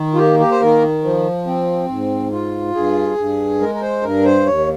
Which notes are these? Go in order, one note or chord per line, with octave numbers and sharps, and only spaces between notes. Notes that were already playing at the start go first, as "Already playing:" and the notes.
Already playing: D#3
F4
A#3 G4
G4
C5
D#3 A#4
F3
C4
G#2
F4
G2 G#4
G2
G#3 A#4
A#4
C5
G2 A#4
C5
D#2 C#5